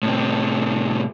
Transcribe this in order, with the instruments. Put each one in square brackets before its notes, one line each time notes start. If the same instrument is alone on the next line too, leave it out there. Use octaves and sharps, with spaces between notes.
[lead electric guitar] A2 C3